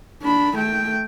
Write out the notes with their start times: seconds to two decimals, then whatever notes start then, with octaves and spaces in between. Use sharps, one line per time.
0.22 D4 B5
0.57 A3 G5